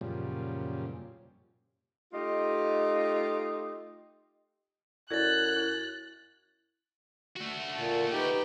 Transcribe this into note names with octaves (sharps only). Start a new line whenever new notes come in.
F#2 A#2 C#3 F3 G3
A3 D#4 F4 G4 D#5
F#2 E4 A4 D5 F#6 G#6 A6
E4
A3 F#4
A#2 A5
D#4 G4 B4 G5